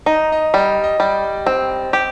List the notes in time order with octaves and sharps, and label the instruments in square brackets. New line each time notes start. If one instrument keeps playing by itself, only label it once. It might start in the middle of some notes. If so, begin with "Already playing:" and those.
[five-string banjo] D#4 [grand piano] D#5
[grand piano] D#5
[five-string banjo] G3 [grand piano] D#5
[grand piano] D#5
[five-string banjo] G3 [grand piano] D5
[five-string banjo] C4
G4